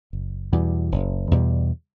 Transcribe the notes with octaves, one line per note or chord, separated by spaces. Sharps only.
F#1
E2 B2 G3
F#1
E2 B2 G3